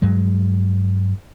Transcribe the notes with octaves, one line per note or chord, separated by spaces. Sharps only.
G2 F#3 G#3